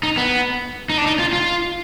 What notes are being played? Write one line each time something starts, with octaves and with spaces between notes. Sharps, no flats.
D#4
B3
D#4
D4
D#4
F4
F4